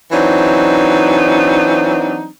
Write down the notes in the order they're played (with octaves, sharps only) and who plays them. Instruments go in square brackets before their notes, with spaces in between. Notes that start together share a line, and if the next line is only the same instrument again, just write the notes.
[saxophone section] E3 F#3 C4 D4 D#4